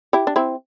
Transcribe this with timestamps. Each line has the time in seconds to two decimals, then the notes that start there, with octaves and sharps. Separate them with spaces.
0.13 E4 G4
0.27 D4
0.36 C4 E4